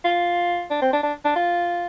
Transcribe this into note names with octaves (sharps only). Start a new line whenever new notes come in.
F4
D4
C4
D4
D4
D4
F4